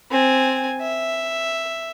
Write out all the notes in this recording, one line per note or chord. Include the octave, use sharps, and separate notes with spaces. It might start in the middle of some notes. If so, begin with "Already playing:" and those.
C4 G#5
E5